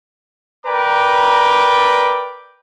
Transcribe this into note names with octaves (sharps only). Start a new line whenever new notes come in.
A#4 B4 D5 G5 A#5 D6